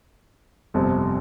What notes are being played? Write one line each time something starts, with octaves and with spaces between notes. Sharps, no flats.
G1 F2 C3